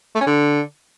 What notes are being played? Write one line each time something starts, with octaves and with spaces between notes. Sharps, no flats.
A3
C#4
D3